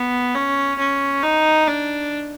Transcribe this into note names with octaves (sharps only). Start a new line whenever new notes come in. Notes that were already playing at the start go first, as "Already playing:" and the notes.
Already playing: B3
C#4
C#4
D#4
D4